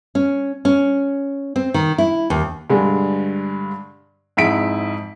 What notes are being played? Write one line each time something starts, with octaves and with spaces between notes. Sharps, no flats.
C#4
C#4
C4
D#3
E4
D#2
G2 D3 G#3
F2 G#2 E4 B6 D7